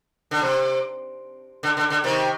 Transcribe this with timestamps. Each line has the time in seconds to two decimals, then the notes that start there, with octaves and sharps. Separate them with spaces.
0.31 D3
0.42 C3
1.63 D3
1.77 D3
1.90 D3
2.04 C3 D#3